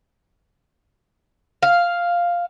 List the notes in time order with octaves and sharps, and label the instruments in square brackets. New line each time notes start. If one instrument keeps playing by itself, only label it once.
[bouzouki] F5